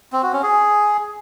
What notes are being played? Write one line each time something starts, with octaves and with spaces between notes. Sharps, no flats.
C4
F#4
C#4
G#4